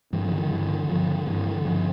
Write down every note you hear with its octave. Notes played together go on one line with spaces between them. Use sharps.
G2 E3
F3
D3
E3
G2 E3
D3
G2 F3
D3
G2 E3
D3
G2 F3